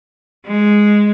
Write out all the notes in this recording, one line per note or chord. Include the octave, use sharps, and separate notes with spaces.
G#3